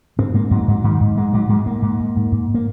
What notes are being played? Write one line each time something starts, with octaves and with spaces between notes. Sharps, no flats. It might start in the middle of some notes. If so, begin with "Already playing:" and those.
G#2 C4
G#2 A#3
G#2 F#3
G#2 F#3
G#2 D#3
G#2
G#2 G#3
G#2 F#3
G#2 G#3
G#2 A#3
G#2
G#2
G#2
G#2
A#3